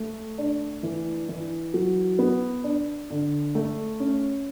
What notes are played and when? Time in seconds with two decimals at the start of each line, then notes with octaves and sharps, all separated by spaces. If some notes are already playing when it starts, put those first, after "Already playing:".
Already playing: A3
0.38 D4
0.83 E3
1.29 E3
1.74 F#3
2.19 B3
2.64 D4
3.10 D3
3.55 A3
4.00 C#4